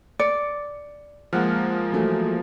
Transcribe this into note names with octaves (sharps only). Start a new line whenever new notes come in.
D5 C#7
F3 G#3 A#3 F#5 F6
E3 F#3 A3